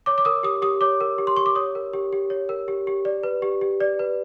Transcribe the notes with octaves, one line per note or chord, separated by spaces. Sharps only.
C#5 D6
D6
A#4 D#6
G4 D#6
G4 D#6
C#5 D6
A#4
G4
C6
G4 C#6
D6
C#5 D#6
A#4
G4
G4
C#5
A#4
G4
G4
D5
B4
G4
G4
D5
B4